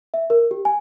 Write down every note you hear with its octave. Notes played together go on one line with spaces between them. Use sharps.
E5
A#4
G4
G#5